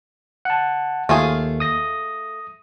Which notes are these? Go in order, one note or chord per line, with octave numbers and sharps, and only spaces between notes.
F#5 A5
D#2 A3 F4 G#4
D#6 A#6